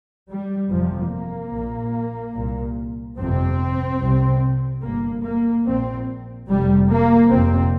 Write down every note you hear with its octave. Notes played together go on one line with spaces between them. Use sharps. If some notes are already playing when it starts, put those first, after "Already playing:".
G3
G1 F2 C3 F3
A#3
A#1 A#2
C2 A#2
G1 F2 C3 C4
C2 C3
G1 G2 A#3
A#3
A#1 A#2 C4
F1 F2 C3 G3
A#3
F1 F2 C3 C4